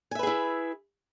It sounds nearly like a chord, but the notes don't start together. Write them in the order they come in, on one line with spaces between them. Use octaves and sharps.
G#5 E5 B4 G#4 E4